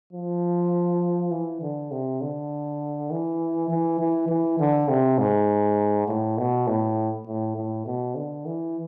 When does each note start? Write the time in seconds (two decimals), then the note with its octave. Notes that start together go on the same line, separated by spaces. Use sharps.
0.13 F3
1.31 E3
1.62 D3
1.92 C3
2.21 D3
3.11 E3
3.70 E3
4.00 E3
4.29 E3
4.60 D3
4.89 C3
5.19 G#2
6.08 A2
6.38 B2
6.67 A2
7.26 A2
7.57 A2
7.87 B2
8.16 D3
8.46 E3